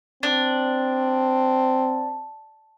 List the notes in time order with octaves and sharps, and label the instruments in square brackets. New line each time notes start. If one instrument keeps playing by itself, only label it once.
[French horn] C4 [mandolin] D4